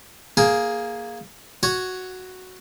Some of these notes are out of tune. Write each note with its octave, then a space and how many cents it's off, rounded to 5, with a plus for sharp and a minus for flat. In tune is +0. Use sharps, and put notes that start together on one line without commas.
A#3 +0 G#4 +5
F#4 +0 C#5 +0